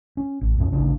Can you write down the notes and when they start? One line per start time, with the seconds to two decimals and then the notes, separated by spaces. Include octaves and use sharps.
0.17 C#4
0.41 A1
0.57 C2 F2 A#2 C#4
0.72 D1 A1 C#3 D4